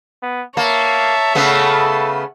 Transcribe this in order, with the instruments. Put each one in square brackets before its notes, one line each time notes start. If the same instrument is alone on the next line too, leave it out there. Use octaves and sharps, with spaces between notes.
[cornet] B3
[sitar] A#3 [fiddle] C#5 E5 [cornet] A5
[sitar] C#3 A3 B3 [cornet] A4